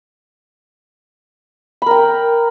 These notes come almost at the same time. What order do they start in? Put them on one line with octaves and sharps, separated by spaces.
B5 A#4 G5